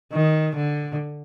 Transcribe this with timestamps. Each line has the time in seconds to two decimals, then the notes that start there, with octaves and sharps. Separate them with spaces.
0.12 D#3
0.55 D3